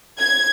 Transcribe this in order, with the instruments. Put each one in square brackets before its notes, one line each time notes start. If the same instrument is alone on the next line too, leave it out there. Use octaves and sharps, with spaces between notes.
[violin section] G#6